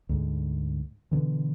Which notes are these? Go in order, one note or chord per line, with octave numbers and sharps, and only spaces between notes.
D2 G#2
B2 D3 E3